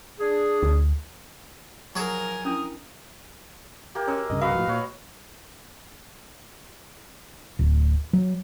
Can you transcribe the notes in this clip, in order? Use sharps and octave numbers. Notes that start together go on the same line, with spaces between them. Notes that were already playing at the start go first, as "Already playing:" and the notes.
D4 G#4
D2
F3 F#3 G#4 A#4 G#5
C#4 D4 E4 D#6
A#3 G4
G#3 C#4 A#4 E6
C2 G2 C#3 D#5
F#4 B4 D#5 F5
A2 F3
A#2 F#4 C#5
D1
F#3